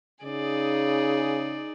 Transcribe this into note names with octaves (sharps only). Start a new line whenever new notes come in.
C#3 D#4 G#4 D5